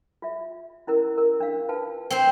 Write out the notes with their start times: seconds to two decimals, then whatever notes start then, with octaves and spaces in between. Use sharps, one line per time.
0.22 F4 E5
0.87 C#4 E4 A#4
1.18 A#4
1.40 D4 F5
1.69 F4 B4 A5
2.10 C4 C5